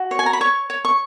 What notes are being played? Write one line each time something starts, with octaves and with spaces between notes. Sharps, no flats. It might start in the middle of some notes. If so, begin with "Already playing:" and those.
Already playing: F#4
C#5
G#5
A#5
B5
C#5 C#6
C#5
C#6